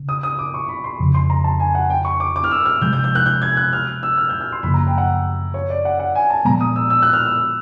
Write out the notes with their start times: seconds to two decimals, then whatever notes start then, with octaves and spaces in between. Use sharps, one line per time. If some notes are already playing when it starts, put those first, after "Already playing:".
Already playing: C#3
0.09 D#6
0.23 D#6
0.39 D6
0.54 C#6
0.68 B5
0.84 C6
0.99 F2 C#3 F3
1.14 C6
1.30 A#5
1.44 A5
1.60 G#5
1.75 F#5
1.90 G5
2.05 C#6
2.20 D6
2.36 D6
2.44 F6
2.51 E6
2.65 F6
2.81 C3 F3 G#3 G6
2.93 G6
3.04 G6
3.15 F#6
3.26 G6
3.42 G#6
3.57 F#6
3.73 F6
4.03 E6
4.17 F6
4.29 G6
4.41 F6
4.52 C6
4.63 F#2 C#3 F3 A#3 B5
4.74 A#5
4.87 G5
4.98 F#5
5.54 C#5
5.70 D5
5.85 F#5
6.00 F#5
6.15 G#5
6.30 A5
6.45 A#2 F3 G#3 B3 A#5
6.61 D#6
6.76 E6
6.90 E6
7.02 F#6
7.13 F6
7.26 E6